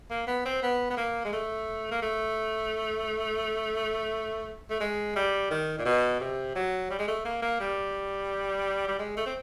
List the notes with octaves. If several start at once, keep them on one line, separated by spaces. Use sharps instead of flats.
A#3
B3
C4
B3
B3
A#3
G#3
A3
A#3
A3
A3
G#3
G3
D#3
A#2
B2
C3
F#3
G3
G#3
A3
A#3
A#3
G3
G3
G#3
A3
C4